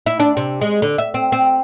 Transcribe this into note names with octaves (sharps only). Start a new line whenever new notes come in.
E4
D4
C3
G#3
D3
E5
C4
C4